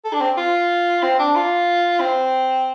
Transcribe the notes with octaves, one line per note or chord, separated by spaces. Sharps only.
A4
D4
C4
F4
C4
D4
F4
C4